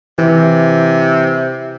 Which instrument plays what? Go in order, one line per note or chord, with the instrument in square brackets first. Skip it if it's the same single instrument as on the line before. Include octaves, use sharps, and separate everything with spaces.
[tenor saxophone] C3 [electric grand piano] E3